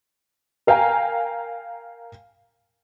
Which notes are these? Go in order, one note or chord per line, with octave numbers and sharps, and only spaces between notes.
A#4 F5 G5 G#5 A#5